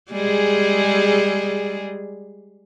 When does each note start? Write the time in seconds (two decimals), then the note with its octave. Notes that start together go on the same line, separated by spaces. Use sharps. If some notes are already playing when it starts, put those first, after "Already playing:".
0.12 G3 G#3 G#4